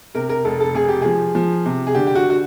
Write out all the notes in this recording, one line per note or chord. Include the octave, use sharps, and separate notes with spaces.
C3 A#4
A#4
F1 A4
A4
F1 G#4
G4
F3 G#4
F3
C3
G#4
D3 G4
G4
F#4
F#4